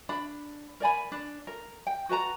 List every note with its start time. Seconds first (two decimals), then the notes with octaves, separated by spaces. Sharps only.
0.09 D4 B5
0.80 A#4 D5 G#5 B5
1.12 D4
1.47 A#4
1.87 G5
2.09 F#4 B4 A5 A#5